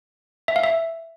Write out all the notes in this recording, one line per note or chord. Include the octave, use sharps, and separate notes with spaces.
E5
F5
E5